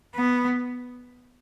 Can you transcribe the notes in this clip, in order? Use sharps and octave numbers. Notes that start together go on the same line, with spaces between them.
B3